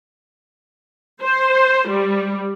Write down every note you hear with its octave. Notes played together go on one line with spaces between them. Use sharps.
C5
G3